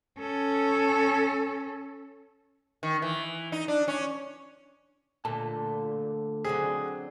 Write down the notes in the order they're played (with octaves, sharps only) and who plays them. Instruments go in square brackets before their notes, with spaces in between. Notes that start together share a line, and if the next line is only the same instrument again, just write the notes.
[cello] C#4 A4
[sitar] D#3
E3
D#4
D4
C#4
[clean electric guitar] D2 A4 A5 [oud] A#2
[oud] D3 F#3 C4 [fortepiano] G#4